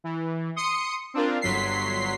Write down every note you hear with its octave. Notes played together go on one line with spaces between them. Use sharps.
E3
C6 D#6 C#7
C4 D4 F4 A#4
G1 F#3 C6 B6 C7